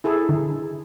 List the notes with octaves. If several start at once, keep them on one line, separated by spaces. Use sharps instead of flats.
E4 G#4 A4
D3